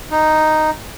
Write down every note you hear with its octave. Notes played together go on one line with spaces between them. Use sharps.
D#4